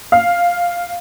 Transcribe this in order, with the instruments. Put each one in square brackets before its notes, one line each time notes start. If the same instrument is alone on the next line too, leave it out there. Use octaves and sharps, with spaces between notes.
[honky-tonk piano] F5